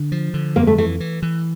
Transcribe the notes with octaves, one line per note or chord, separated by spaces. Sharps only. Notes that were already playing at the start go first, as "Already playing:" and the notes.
Already playing: D3
F3
D3
F2 A#3
A3
E3 A3
E3
E3